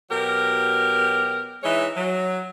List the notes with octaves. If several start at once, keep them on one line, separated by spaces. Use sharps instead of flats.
B2 F#3 G4 A#4
E3 G#3 D#4 C#5 E5
F#3